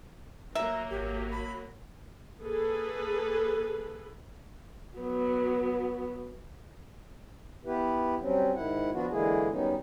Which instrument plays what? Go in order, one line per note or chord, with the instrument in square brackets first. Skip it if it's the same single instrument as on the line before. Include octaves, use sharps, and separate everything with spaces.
[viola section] F#3 A#3 [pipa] E5 [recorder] A#5
[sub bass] G#1 [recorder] G4
[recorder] B5
[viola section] A#3 G#4 A4 B4
[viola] F#3 B3
[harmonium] B3 E4 G4 B4
F#3 G3 C4 C#4
G#2 D#3 E4 F#5
F3 B3 D4 F4 F#4
D3 E3 G#3 A#3 E4 G#4
D#3 F#3 G3 B3 C#4 D#4